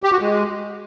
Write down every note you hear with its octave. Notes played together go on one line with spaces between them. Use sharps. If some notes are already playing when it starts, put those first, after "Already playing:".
G4
F#4
G#3